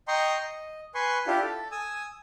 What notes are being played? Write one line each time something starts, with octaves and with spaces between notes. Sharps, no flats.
D#5 G5 A#5 C6 C#6
D#5
B4 G#5 C6 C#6
D4 E4 F4 G4
A4
G#5 D#6 E6